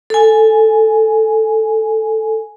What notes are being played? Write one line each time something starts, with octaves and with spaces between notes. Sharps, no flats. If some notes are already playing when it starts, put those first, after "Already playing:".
A4 G#5